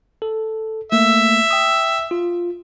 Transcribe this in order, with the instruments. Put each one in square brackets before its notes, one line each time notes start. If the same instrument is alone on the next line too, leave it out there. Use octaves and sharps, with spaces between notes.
[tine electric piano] A4
[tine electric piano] A3 A#3 [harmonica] E5
[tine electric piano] G5 D#6
F4